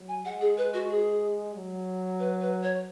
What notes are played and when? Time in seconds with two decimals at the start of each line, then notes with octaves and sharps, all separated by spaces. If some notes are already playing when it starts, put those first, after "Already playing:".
Already playing: F#3
0.08 G#5
0.25 G#3 F#5
0.41 G#4
0.58 B4
0.74 F#4
0.90 G#4
1.55 F#3
2.19 B4
2.41 B4
2.63 C#5